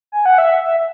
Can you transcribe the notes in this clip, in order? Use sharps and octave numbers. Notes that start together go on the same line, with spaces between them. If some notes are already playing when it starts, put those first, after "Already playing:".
G#5
F#5
E5
E5